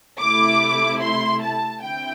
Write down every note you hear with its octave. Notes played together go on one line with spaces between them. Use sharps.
C3 A3 E4 D6
C6
A5
D3 C4 E4 G5